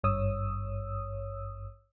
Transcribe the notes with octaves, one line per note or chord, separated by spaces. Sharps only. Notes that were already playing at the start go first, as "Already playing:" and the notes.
G#1 G2 C#5 D#6 E6